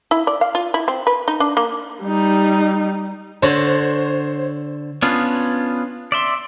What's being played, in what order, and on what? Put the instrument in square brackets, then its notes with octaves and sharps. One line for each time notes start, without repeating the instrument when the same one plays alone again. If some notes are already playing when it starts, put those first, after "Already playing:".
[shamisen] E4
D5
F5
F4
E4
C4
B4
D#4
D4
A#3
[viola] G3 D#4
[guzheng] D3 F#4 [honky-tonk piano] C5 C#5
[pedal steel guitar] B3 C#4 D4 F4
D5 E5 C6